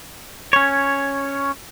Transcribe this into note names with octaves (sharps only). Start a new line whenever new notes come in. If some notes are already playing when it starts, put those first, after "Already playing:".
C#4 C#5